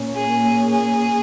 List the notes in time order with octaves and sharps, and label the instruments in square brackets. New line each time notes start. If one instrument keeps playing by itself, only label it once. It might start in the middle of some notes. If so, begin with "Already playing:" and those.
Already playing: [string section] A#2 A#3 C#4
[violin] G#4
G#4